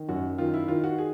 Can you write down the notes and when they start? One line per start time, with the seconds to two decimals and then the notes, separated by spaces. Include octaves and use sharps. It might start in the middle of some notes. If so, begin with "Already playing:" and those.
Already playing: D#3
0.09 F#2 F#4
0.38 D#3 F4
0.54 E4
0.68 D#3 F4
0.84 F#4
0.98 G#4